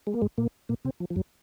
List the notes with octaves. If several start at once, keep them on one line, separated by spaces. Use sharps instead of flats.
G#3
A#3
G#2 G#3
A#2 A#3
A#2 A#3
C3 C4
F3
F3
F#2 F#3